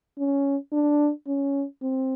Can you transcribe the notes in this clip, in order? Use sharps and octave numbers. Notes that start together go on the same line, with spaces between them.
C#4
D4
C#4
C4